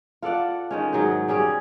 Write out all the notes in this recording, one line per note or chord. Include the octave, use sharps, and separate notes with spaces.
F4 A4 D5 F#5
D#3 G#3 C#4
G#2 F#3 G#4 C5
G3 C#4 G#4 D5